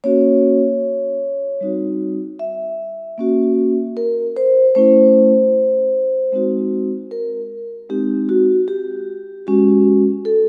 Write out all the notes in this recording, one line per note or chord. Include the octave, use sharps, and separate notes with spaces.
A#3 C#4 F#4 C#5
G3 C4 D#4 F#4
E5
A#3 C#4 F#4
A#4
C5
A3 C#4 E4 C5
G#3 C4 D#4 F#4
A#4
G#3 C4 D#4 G4
F#4
G4
G#3 C#4 F#4
A4